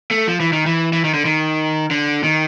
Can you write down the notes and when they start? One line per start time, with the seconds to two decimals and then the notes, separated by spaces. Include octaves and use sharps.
0.11 A3
0.27 F3
0.40 E3
0.52 D#3
0.66 E3
0.93 E3
1.04 D#3
1.14 D3
1.25 D#3
1.91 D3
2.24 D#3